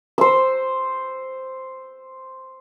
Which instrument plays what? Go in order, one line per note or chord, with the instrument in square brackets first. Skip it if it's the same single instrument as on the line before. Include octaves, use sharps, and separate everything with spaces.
[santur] C5 E6